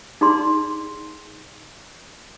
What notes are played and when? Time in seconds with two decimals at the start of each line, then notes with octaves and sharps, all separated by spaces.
0.21 D#4 G#4 D5 C6